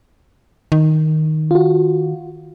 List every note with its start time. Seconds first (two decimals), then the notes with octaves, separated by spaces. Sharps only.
0.72 D#3
1.51 F4 F#4